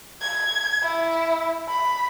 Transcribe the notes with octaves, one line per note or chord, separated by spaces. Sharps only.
G#6
E4
B5